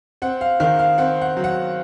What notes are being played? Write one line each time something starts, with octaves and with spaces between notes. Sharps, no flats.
C4 F#5
F5
D#3 F5
F5
C4 F#5
F#5
F#3
F#5